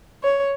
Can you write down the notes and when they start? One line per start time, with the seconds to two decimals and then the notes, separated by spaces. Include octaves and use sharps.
0.23 C#5